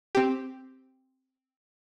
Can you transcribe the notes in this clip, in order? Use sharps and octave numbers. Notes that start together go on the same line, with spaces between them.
C4 G4